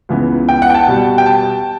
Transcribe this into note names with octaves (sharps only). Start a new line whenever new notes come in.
C#2 C#3 E3 B3
G5
F#5
G5
A5
B2 G3 B3
G5
A5